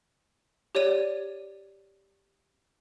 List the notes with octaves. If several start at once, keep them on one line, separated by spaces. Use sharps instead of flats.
G4 C#5 D5 D#7